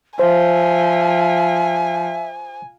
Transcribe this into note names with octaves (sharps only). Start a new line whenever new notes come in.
F3 C5 E5 G#5